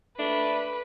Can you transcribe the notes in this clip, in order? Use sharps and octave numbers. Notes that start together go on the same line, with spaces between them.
A3 D4 B4